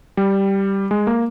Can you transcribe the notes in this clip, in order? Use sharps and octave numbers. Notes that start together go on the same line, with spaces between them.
G3
G#3
A#3